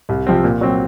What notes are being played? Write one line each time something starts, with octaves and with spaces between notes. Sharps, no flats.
C2
C3 F3 C4
A#2
F#3 C4